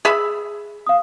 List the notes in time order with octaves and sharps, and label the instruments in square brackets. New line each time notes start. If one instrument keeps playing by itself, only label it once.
[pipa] G#4 E5 B5
[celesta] F5 D#6